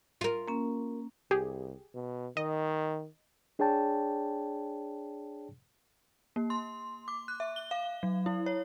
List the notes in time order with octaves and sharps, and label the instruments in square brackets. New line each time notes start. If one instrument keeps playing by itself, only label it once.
[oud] F4 A#4
[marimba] A#3 C#4
[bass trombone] C2 [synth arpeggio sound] G4 G#4
[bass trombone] B2
[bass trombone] D#3 [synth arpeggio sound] D#5
[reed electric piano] D4 G#4 C#5 D5 G5 A5
[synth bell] A#3
C6
D6
F#6
E5
G7
F5
F#3
E4
C#5